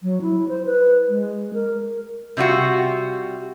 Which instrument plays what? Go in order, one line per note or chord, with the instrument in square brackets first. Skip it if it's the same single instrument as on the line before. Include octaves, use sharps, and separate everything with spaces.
[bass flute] F#3
E4
C5
B4
G#3
A#4
[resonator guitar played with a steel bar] C3 G3 F4 F#4